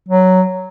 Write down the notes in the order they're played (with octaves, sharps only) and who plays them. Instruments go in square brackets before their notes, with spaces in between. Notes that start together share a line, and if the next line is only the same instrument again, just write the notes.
[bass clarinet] F#3